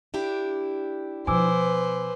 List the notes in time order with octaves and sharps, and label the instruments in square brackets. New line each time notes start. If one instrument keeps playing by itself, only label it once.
[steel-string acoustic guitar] D4 E4 G4
[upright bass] B2 F3 [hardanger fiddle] B4 C5 [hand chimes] G#5 D6 E6